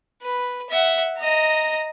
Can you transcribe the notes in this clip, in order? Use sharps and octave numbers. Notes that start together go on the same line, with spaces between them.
B4
E5 F#5
D#5 A#5